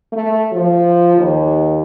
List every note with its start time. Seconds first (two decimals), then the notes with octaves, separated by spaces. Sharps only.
0.13 A3
0.52 F3
1.17 D#2